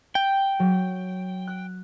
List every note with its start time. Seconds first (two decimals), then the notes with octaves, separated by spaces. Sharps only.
0.15 G5
0.59 F#3
1.47 F#6